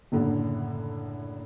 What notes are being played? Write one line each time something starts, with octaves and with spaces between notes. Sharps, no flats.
F#1 A2 D3 F#5